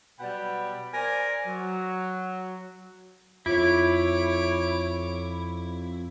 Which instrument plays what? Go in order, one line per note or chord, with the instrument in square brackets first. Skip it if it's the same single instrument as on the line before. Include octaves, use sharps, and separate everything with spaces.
[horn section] B2 F#3 G3 F#5 G5 B5
A#4 C5 D5 G#5
F#3
[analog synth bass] F2 [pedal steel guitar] E4 [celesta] F4 [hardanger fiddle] C#5 D6